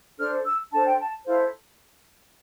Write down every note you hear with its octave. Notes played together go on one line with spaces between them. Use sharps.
D4 A4 C5 F6
E6
D4 A4 C5 A5
G5
A5
E4 A4 C5 F5